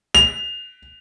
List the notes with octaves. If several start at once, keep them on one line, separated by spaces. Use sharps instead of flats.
F7